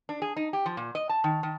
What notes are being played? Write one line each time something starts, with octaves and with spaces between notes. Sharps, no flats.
D4
G#4
D#4
G4
F3
A#2
D#5
A5
D#3
D#3